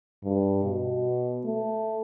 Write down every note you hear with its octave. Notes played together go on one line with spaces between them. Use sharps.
G2
B2
A3